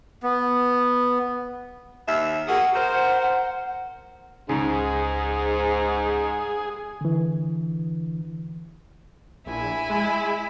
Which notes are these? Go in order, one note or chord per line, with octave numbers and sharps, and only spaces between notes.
B3
D#2 E5
A#3 F#4 G#4 F#5
A#4 C5
F#5
C#2 G#2 C#3 G#4
D3 E3
A#1 E4 G#5
G#3